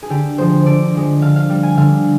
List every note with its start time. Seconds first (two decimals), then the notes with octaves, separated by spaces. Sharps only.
0.03 G#4
0.10 D3 G4
0.38 F3 G#3 C5
0.65 D3 D5
0.95 F3 G#3
1.22 D3 F5
1.36 F5
1.50 G3
1.63 G#5
1.77 D3 F5